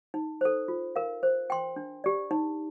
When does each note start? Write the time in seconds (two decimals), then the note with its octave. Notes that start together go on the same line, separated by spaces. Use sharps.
0.14 D#4
0.41 A4 C5
0.68 F4
0.96 A#4 F5
1.23 C5
1.50 G5 C6
1.76 D4
2.04 G4 D5
2.31 D#4